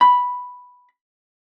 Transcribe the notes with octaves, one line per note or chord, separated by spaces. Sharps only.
B5